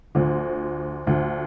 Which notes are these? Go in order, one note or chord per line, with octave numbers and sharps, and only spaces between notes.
D2 D3 F3
D2 D3 F3